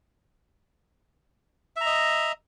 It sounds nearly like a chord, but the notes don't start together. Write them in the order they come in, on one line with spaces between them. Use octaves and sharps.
E5 A#5 D#5